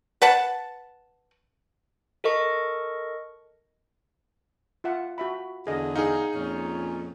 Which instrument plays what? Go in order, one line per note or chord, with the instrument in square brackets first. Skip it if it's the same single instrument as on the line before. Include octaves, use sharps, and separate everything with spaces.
[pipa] B4 F#5 A5
[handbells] A4 A#4 D#5 C#6
[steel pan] F4 E5 F#5
F#4 E5 B5
[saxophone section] E2 D3 [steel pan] G#4 D#5
[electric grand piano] D#4 G#4 [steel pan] F5
[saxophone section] F2 A#2 C#4